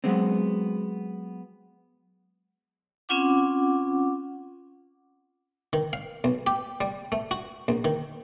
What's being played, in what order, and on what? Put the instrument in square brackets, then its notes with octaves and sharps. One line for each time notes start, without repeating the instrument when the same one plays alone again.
[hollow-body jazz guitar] F#3 G#3 B3 C4
[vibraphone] C4 C#4 F4 F#5 D6
[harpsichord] D#3
F5
B1
G4
G3
A3
F#4
A#1
D#3